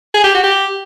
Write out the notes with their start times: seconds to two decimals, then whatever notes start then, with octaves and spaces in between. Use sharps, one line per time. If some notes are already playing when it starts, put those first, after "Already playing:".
0.14 G#4
0.24 G4
0.35 F#4
0.44 G4